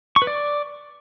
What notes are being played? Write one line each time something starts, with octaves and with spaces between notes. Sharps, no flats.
C#6
B4
D5